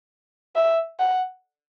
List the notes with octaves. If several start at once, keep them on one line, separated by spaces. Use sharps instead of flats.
E5
F#5